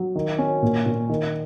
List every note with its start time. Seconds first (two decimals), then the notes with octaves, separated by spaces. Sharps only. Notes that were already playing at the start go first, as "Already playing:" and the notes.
Already playing: F#3
0.15 D#3
0.39 C#4
0.63 A#2
0.86 A#2
1.09 D#3